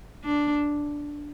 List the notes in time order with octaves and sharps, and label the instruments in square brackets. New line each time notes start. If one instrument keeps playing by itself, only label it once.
[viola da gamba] D4